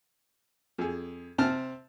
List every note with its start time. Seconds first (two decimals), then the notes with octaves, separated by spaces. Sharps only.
0.78 F2 G#4
1.38 C3 C4 A5 F6